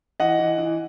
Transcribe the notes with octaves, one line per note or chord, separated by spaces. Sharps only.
E3 D#5 F#5
E3
E3